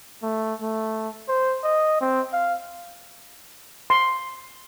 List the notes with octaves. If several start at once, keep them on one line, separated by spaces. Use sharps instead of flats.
A3
A3
C5
D#5
C4
F5
C6